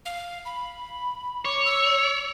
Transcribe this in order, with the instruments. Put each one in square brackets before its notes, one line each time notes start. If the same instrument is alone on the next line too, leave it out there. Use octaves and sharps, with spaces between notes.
[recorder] F5
B5
[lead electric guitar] C#5 [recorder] D6
[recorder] E6